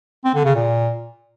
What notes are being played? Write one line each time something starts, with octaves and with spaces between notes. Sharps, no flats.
C4
D3
C#3
A#2